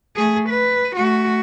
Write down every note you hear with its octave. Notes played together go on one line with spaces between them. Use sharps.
A3 G#4
B4
A3 F#4